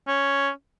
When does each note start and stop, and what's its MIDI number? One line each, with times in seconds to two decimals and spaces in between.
0.07 0.50 61